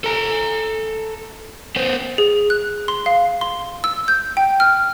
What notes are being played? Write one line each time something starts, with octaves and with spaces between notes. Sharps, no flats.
A4 A#5
B3 C5
G#4
F#6
C6
F5
C6
E6
G6
G5
F6